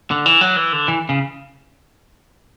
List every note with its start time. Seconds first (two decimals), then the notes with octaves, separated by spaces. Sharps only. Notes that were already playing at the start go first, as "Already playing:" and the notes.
0.11 D3
0.26 E3
0.41 F#3
0.57 E3
0.73 D3
0.88 E3
1.09 C#3